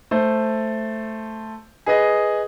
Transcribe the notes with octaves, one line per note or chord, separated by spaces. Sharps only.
A3 C5
G#4 B4 D#5